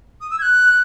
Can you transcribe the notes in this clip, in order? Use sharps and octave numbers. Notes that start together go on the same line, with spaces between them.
D#6
E6
G#6
F#6